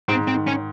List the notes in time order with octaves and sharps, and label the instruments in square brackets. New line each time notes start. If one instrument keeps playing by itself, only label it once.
[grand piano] G#2 [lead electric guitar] C4
[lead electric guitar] C4
[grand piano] D#3
[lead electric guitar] C#4